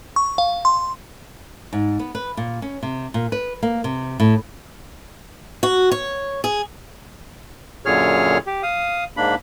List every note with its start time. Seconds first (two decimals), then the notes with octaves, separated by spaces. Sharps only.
0.16 C#6
0.38 F5
0.65 C6
1.73 G#2
1.99 B3
2.15 B4
2.37 A#2
2.62 C#4
2.83 C3
3.14 A#2
3.32 B4
3.63 A#3
3.84 C3
4.20 A2
5.63 F#4
5.91 C#5
6.44 G#4
7.86 F#2 A#2 D3 G#4 C#5 F6
8.47 G4
8.63 F5 D#6
9.17 G#2 A#3 D4 B5